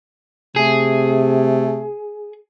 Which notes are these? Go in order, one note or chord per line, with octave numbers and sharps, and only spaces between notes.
C3 A3 G#4